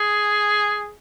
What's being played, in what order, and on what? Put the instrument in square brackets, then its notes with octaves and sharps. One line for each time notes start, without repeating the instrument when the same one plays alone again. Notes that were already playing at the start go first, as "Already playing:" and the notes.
Already playing: [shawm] G#4